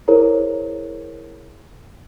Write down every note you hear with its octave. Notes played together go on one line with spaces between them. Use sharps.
E4 G#4 A#4 C5 C#5 A#5